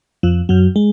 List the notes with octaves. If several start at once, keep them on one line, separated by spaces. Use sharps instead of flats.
F2 F3
F#2 F#3
G#3